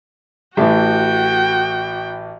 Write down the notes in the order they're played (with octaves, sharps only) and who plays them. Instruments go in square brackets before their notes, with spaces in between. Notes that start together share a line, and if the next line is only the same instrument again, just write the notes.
[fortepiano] A1 A2 E3 [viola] F#4 G5